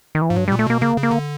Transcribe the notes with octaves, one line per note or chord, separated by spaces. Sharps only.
D#3
E3
G#2 F3
G2 F#3
G3
A#2
A3
B2 A#3
C#3 A#3
C#3
A#3
D3